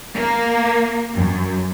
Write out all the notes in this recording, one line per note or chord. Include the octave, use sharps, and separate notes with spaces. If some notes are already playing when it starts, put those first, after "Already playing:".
A#3
F#2